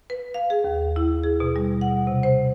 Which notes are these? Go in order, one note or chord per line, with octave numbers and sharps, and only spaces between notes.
B4
F5
G#4
D#2
E4
G#4
B2
G3
F#5
C3
C5